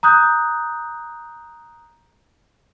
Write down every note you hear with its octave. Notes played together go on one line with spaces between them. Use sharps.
A#5 D#6 F#6 G6